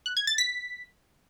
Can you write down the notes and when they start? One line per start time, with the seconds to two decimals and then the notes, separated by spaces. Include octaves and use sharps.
0.06 F#6
0.17 G#6
0.27 A6
0.38 B6